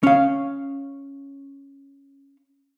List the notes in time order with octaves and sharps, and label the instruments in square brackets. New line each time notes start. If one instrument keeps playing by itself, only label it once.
[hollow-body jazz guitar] C#4 F5